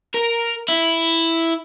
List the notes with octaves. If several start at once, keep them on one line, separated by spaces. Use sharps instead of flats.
A#4
E4